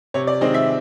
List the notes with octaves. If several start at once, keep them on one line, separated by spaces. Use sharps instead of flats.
C3 C#5
D5
D#3 G#3 C4 D#5
E5